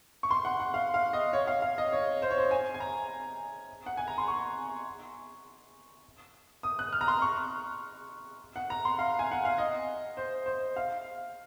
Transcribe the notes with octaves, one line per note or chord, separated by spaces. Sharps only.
C#6
C6
F#5
F#5
F5
F5
D#5
C#5
F5
F5
D#5
C#5
C5
C#5
C5
G#5
G#5
A#5
F#5
G#5
A#5
C6
C#6
D#6
F#6
F6
A#5
C6
C#6
F#5
A#5
C6
F5
G#5
F#5
F5
D#5
C5
C5
F5